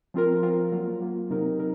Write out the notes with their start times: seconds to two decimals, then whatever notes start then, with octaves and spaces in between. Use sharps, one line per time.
0.14 F3 C4 F4 A#4
0.43 F3 C4 F4 A#4
0.72 F#3 A#3 F4
1.01 F#3 A#3 F4
1.30 C3 F#3 C4 D#4 A#4
1.59 D#4 A#4